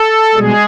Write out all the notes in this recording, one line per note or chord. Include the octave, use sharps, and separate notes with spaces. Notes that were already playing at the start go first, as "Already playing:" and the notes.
Already playing: A4
B2 G3 G#3 G#4